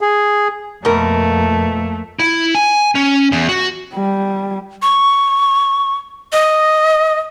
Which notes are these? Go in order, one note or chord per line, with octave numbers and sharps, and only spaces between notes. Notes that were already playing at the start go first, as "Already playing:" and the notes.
G#4
F2 B2 A3 A#3 A#4
E4
G#5
C#4
E2
F#4
G3
C#6
D#5